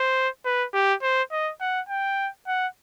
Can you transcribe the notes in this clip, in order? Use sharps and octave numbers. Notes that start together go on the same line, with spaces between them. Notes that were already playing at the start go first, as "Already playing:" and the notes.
Already playing: C5
B4
G4
C5
D#5
F#5
G5
F#5